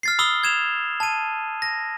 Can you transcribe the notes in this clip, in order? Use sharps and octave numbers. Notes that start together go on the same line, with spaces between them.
F6 A6 C7
B5 D#6 E6 G7
G#6 E7 F7
A5 D#7
A#6